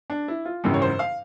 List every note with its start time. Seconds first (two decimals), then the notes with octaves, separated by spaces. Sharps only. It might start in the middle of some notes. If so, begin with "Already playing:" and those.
0.10 D4
0.28 E4
0.45 F4
0.64 G#1 F#2 C#3 E3 G4
0.74 C#5
0.82 C5
0.99 F5